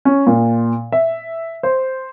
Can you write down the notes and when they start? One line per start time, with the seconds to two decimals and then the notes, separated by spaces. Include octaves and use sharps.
0.05 C#4
0.27 A#2
0.92 E5
1.63 C5